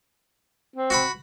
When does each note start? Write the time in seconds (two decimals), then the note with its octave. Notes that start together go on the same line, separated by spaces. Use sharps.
0.76 C4
0.90 F#4 F#5 B5